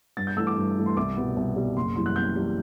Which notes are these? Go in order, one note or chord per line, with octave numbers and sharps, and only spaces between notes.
G2 A6
G6
E3 A3 E6
D6
G2
E3 A3
C6
C2 D6
B2 G3 B3
C2
B2 G3 B3
F#1 C6
F#2 E3 G3 C6
F#6
F#1 G6
E3 G3